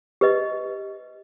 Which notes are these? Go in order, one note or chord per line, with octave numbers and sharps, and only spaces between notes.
G4 B4 D#5